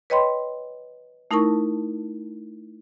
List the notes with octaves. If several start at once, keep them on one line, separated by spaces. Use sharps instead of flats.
B4 C#5 D#5 G5 B5 C6
A3 D#4 E4 A#4 A5 C#6